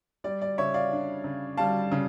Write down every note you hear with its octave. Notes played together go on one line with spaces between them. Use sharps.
G3 D5
D5
C#3 C#5 E5
D5 F5
D4
C#3
G3 F5 A5
C#3